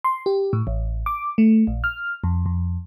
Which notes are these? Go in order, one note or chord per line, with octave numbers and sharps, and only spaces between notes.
C6
G4
A2
A1
D6
A3
A#1
F6
F2
F2